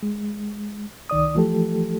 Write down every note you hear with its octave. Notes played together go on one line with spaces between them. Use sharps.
G#3
C2 D#3 D5 D#6
E3 F3 A3 G4 A4